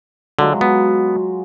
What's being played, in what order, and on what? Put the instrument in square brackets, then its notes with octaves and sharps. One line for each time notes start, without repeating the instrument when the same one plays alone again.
[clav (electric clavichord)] D3 [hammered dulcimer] F#3 G#3 F4
[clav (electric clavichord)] B3